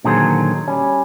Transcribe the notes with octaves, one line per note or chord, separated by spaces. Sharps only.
A#2 D3 D#3 F#3 G#4 C5
G3 C#4